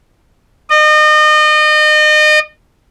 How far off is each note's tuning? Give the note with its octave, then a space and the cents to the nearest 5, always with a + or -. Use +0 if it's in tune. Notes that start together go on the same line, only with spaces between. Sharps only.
D#5 -35